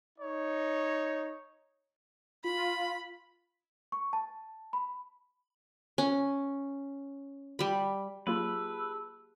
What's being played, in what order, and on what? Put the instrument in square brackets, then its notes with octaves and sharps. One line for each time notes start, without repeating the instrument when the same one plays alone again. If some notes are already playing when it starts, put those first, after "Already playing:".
[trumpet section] D#4 C#5
[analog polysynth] F4 [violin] B5
[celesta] C#6
A5
B5
[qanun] C#4
G3 B5
[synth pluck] F#3 A#3 F4 [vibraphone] G4 G#4 A5 [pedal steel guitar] B4 [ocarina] E6